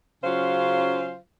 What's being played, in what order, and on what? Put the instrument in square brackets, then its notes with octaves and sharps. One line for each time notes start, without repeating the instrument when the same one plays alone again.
[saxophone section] C#3 F#3 C#4 F4 C5 F5